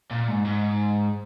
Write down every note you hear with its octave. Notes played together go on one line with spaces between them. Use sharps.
A#2
G#2
G#2